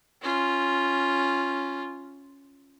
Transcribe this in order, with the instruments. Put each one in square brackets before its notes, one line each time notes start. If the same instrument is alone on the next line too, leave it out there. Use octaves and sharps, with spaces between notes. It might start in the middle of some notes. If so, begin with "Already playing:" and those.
[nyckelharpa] C#4 F4